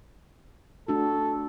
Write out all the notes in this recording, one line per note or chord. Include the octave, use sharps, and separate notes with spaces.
A3 D4 F#4 A4